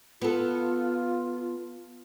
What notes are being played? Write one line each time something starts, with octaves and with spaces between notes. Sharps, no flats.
B3 F4 A4